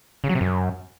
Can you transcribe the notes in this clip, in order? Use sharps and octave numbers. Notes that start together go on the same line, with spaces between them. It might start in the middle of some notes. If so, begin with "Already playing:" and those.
C#3
F#3
C3
F#2